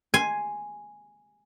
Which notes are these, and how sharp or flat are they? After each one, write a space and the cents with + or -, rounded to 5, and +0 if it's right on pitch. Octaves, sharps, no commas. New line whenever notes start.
G#5 +0 C6 +0